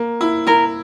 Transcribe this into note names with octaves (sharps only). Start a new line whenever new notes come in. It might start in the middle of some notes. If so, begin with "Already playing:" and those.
Already playing: A#3
E4
E4 A#4